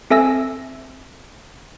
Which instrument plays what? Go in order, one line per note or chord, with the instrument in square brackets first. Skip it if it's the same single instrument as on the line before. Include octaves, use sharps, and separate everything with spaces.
[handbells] C4 A4 E5 G#5 E6 A#6